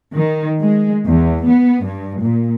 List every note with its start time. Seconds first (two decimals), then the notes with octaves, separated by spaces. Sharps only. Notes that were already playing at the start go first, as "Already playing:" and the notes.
0.15 D#3
0.62 G#3
1.06 E2
1.46 B3
1.86 G2
2.23 A#2